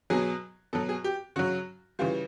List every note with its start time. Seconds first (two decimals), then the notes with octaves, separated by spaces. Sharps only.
0.10 B2 F#3 G#4
0.73 B2 F#3 A4
0.89 G#4
1.04 G4
1.36 C#3 F#3 F#4
1.99 C#3 E3 G3 F4